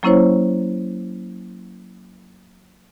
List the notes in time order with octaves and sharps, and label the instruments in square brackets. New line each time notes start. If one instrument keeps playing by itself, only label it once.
[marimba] F#3 A#3 C#4 E4 C5 C#5